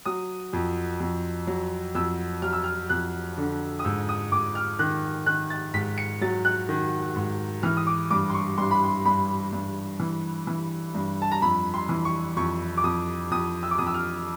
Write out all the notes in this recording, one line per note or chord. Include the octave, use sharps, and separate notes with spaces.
F#3 D#6
F2
F2
F#3
F2 E6
F#3 F6
E6
F6
F2 F#6
D3
D#6
G#2 E6
D#6
G#2 D6
F6
D#3 F#6
D#3 F#6
A6
G#2 B6
C#7
F#3 A6
F#6
D#3
G#2
E3 F6
D#6
D6
G2 D6
C6
C#6
G2 C6
B5
C6
G2 B5
G2
E3
E3
G2
A5
A#5
F2 B5
C6
E3
C#6
F2 C#6
D6
F2 D#6
F2 D#6
E6
D6
F2 D#6
E6
F6